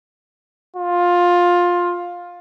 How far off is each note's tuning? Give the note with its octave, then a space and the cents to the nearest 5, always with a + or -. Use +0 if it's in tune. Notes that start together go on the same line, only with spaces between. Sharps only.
F4 +15